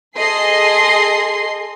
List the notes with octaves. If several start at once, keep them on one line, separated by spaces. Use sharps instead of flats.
G#4 A4 D#5 C6 C7